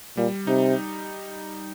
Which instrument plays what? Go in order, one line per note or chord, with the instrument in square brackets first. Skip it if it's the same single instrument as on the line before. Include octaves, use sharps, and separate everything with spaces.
[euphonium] A#2 [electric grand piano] G3
[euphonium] C3 [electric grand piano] D#4